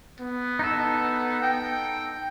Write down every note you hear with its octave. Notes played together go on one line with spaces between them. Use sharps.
B3
D#4 A4
G5